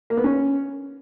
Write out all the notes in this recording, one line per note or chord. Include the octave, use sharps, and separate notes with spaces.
A#3
B3
C#4